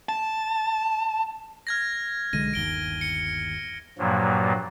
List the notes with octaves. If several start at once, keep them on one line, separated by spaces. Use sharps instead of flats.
A5
F6 G#6 A#6
B1 D3 G#3 A#6 D#7
G1 D#2 D7 G7
C#7
G2 A#2 F3 F#3 A#3